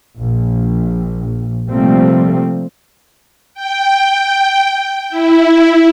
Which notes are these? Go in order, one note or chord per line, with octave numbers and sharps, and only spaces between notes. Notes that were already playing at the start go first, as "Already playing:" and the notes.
A#1
C3 F3 G3 A3 A#3 C4
G5
E4